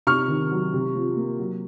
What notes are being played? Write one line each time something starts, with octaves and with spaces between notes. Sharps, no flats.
C3 C#6 F6
D#3
F#3
C3
F3
A#3
F#3